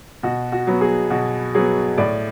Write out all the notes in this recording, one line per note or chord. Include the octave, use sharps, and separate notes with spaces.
B2 F#4
F#4
F#3 B3
G#4
B2 F#4
F#3 B3 G#4
A2 D5